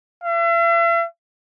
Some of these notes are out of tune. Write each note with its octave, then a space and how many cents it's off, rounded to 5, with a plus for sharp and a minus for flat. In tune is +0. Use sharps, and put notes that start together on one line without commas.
E5 +40